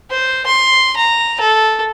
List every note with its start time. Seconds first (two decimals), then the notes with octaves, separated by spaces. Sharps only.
0.11 C5
0.47 C6
0.96 A#5
1.40 A4